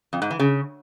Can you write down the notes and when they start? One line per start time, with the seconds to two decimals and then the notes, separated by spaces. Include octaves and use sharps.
0.13 F2
0.22 G#2
0.31 E3
0.39 C#3